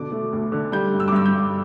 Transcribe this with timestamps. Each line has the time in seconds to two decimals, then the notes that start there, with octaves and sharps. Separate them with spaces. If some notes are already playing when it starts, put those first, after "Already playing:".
Already playing: B2 D3 D6
0.12 A3
0.33 D2
0.52 D3
0.72 G3 G6
0.93 G2
1.00 E6
1.08 D6
1.12 G2 E6
1.26 G6
1.33 G2